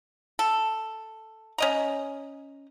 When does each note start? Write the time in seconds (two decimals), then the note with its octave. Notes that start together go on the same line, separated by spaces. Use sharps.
0.39 A4
1.58 C#4 D#5 A#5